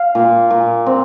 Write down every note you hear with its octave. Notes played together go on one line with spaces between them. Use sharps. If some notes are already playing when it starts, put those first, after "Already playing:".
Already playing: F5
A#2
A#2
C4